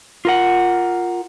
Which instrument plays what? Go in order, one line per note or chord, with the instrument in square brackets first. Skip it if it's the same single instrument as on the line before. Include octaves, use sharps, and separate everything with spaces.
[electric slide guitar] F4 A#4 F#5